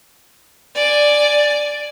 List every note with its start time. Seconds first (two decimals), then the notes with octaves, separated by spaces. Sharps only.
0.75 D5 G#5